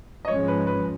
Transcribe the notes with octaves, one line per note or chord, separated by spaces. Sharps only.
D#5
G#2 F3 G#3 C#4 C#5
B4
B4